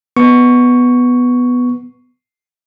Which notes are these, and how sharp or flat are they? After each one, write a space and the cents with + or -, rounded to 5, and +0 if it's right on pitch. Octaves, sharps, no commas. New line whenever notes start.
B3 +0 C#6 +5